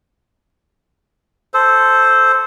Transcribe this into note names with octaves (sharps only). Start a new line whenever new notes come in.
A4 C5